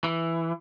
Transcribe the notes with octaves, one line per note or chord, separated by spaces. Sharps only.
E3